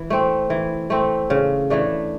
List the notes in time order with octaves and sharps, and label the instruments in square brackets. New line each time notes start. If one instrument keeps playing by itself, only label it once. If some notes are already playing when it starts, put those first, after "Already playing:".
Already playing: [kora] E3
A3 C4
E3
A3 C4
C#3
E3 A3 D4